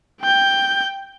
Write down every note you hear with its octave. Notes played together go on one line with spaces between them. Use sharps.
G5 G6